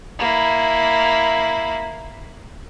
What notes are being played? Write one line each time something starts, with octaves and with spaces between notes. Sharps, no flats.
A#3 E4